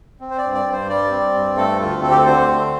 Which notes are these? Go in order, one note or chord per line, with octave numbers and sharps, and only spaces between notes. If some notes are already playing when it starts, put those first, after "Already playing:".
C4
C5
D5
G2
D5
G2
C5
G3 D5
C4
G2
A3 A4
D2 F4
C4 A4
G4
A4
D3 C5
A3